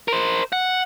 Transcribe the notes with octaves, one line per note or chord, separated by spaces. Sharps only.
A#4 C5
F#5